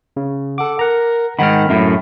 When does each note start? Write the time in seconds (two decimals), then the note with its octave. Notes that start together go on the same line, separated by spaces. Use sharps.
0.17 C#3
0.58 A4 F#5 D6
0.79 A#4 F#5 A#5
1.39 G#2 D#3 F#5 B5 F6
1.69 F#2 A2 E5